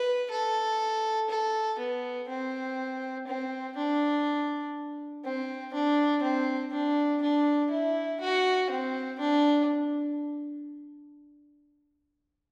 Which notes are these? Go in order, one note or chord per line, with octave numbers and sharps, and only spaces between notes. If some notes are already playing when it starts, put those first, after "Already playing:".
Already playing: B4
A4
A4
B3
C4
C4
D4
C4
D4
C4
D4
D4
E4
F#4
C4
D4